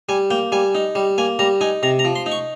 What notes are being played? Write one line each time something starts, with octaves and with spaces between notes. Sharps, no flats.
G3 G#5
A#3 G5
G3 G#5
D#4
G3
A#3 G#5
G3 A#5
D#4 G#5
C3 A#5
A#5
F3
C6
D#4
C#6